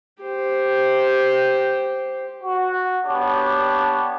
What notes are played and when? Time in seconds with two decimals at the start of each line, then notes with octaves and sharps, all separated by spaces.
0.23 G4 C5
2.44 F#4
3.05 B3 D4 G4 C#5